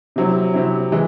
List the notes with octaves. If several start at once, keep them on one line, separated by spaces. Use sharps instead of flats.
C3 F#3 C4 E4
C3 F#3 C4 E4
E3 G#3 E4